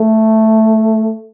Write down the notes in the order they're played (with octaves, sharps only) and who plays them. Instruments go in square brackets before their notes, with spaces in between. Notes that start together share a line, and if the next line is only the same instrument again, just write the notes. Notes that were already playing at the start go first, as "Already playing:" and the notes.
Already playing: [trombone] A3